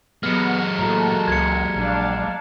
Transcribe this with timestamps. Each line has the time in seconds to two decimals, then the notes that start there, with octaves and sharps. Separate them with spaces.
0.23 F#3 G#3 B3 F6 C#7
0.79 A2 A#3 F#4 A4 A#5
1.28 C#2 G#6 C#7
1.76 A#1 D4 F5